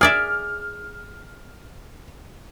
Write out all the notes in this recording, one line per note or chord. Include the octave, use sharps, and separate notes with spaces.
G#4 D5 E5 F6